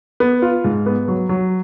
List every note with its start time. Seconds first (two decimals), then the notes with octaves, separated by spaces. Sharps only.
0.20 B3
0.42 F4
0.64 G#2
0.86 B3
1.08 F#3
1.29 F#3